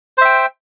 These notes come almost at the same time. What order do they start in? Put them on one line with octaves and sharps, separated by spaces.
C5 E5 G5